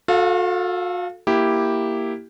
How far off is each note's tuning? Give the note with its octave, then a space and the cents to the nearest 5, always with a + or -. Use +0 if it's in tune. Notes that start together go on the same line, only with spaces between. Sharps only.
F#4 -40 A4 +0 F5 +0
A#3 +0 E4 +0 G4 +0